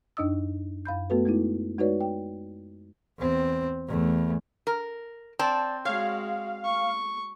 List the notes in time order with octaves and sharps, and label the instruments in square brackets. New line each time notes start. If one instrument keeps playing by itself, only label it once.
[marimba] F#2 D4 D#4 D#5 D#6 E6
F#2 F5 B5 G6
A3 B3 F#4 A4 B4
G#3 A3 D#4 E4
G#3 D#4 F#4 B4 C#5 D5
G5
[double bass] E2 C4
E2 A3
[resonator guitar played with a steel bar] A#4
[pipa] C4 [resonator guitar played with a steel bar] D5 A5
[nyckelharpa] G#3 F#4 [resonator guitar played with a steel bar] C#5 [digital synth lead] F5
[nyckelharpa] C#6